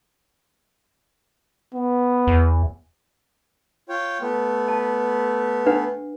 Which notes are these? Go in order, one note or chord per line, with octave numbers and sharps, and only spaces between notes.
B3
E2
F4 C#5 G5
A3 B3
A5
D4 B4 F#5